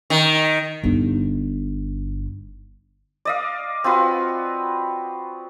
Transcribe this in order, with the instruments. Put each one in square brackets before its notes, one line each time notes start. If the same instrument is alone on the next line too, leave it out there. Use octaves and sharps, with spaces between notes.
[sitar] D#3
[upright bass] G1 D#4
[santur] D5 D#5 F5
C4 F4 F#4 B4